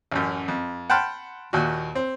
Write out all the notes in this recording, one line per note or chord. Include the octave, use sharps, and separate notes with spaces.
A1 F#2
F2
F#5 G5 A5 B5 C6 F6
D#2 A#2 F#4
C4